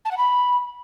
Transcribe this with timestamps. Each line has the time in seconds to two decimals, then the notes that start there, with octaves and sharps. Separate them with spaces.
0.05 A5
0.11 F#5
0.17 B5